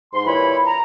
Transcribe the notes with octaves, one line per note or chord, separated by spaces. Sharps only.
G#2 C6
G2 A#2 E3 E4 C#5 B5
A#5